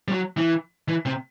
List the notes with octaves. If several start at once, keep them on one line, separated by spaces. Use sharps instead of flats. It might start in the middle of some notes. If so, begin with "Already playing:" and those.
G3
F#3
E3
E3
C3